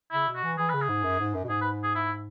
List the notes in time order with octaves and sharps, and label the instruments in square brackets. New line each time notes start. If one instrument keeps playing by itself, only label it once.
[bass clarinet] C#3 [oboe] E4
[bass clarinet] B2
[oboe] F#4
[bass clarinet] E3
[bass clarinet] E3 [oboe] G#4
[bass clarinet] C#3 [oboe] B4
[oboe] G#4
[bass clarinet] G#2
F#2
G#2
F#2
B2
[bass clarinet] G#2 [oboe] G#4
[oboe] B4
G#4
E4